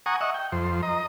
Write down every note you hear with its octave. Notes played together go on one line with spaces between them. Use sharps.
F#5 G#5 A#5 C#6 D#6
D#5 E5 F#5 C#6
G5
F2 C5
D#5 A#5